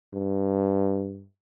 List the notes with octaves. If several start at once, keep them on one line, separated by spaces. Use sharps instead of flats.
G2